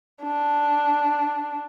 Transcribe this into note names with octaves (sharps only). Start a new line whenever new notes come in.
D4